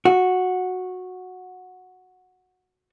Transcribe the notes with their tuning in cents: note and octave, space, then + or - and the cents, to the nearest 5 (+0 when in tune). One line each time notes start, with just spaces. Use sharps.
F#4 -10